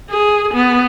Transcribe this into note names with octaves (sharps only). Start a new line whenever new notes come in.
G#4
B3